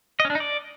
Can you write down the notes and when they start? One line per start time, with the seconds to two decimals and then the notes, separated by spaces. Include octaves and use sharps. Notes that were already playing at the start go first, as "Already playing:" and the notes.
0.20 D#5
0.25 C#4
0.30 D4
0.35 D#4
0.40 D5